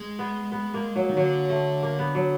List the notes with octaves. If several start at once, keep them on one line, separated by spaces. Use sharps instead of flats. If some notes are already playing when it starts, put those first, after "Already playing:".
Already playing: G#3
B3
B3
A#3
F#3
D#3
D3 F#3
A3
A#3
B3
F#3